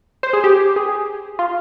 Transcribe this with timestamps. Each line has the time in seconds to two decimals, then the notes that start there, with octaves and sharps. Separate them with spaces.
0.23 C5
0.33 G#4
0.44 G4
0.76 G#4
1.39 F4